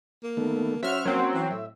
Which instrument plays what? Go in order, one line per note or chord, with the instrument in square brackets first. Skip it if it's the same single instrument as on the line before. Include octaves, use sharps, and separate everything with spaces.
[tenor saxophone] A#3
[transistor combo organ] D#3 A3 B3
[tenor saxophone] F#3 [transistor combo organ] C#4 C5 F#5 [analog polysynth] E5 F6
[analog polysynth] F#3 C4 [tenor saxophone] A#3
[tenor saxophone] E3
[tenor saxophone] A2 [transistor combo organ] E5